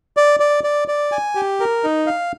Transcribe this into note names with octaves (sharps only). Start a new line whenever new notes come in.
D5
D5
D5
D5
G#5
G4
A#4
D#4
F5